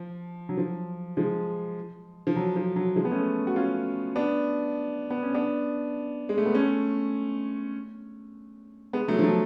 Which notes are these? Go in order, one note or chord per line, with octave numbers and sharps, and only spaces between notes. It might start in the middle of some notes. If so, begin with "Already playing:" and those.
Already playing: F3
F#3
F3
F3 G#3
F3
F#3
F3
F#3
F3 G#3
B3
A3 C#4
F#4
C#4 F4
B3 D4
B3
C#4
B3 D4
G#3
A3
B3
A3 C#4
G#3 B3
F#3 A3
F3
F#3